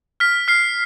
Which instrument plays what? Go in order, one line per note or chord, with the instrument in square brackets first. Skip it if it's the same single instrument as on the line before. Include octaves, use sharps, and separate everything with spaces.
[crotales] F6 B6
F6 C7